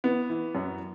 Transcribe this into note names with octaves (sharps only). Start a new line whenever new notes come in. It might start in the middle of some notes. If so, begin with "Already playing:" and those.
E3 B3
E3
F#2